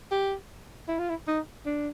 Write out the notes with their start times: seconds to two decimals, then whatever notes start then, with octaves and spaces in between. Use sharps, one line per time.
0.11 G4
0.88 E4
0.99 F4
1.09 E4
1.28 D#4
1.66 D4